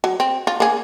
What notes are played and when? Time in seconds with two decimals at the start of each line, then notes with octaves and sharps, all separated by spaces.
0.04 F#3
0.20 C4
0.47 F4
0.60 A#3 G#4